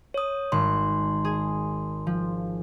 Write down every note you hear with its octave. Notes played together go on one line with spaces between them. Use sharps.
C#5 D#6
G#1 C6
G#4
F3